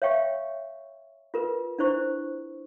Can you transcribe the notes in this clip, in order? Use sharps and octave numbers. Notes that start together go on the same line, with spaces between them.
C#5 E5 F5 G5 C#6
F4 A#4 B4
D4 E4 C5 C#6